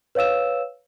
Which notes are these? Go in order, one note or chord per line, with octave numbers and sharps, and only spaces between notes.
B4 C#5 F5 E6 E7